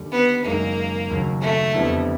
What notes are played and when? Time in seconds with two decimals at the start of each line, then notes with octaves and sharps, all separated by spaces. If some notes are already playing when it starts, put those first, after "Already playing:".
Already playing: D#2 D3 G3
0.12 B3
0.45 F#1 F#2 D#3 G#3 A#3
1.10 D#2 C#3 F#3
1.42 A3
1.74 F2 D3 G3 B3 E4